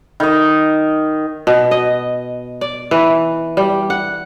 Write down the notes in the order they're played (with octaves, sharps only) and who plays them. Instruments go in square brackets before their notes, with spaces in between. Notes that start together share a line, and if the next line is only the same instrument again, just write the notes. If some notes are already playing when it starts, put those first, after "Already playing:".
[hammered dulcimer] D#3 D#5
[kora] B2
D#5
D5
E3
G3
F#5